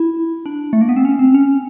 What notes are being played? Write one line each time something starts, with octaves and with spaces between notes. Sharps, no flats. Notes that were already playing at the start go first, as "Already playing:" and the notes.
Already playing: E4
D4
A3
A#3
B3
C4
C#4
C4
C#4